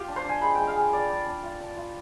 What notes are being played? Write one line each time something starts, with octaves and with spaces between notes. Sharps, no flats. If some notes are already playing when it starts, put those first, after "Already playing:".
Already playing: F4 G4
D4
C5
D4 G#5
G#3 B5
G#3 G5
F5
G#3 G5
D4 D5
D4
D4
F4
D4
F4